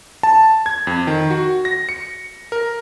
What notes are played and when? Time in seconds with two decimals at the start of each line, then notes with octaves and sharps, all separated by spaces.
0.23 A5
0.66 G#6
0.87 F2
1.07 D#3
1.30 F#4
1.65 A#6
1.89 C#7
2.52 A#4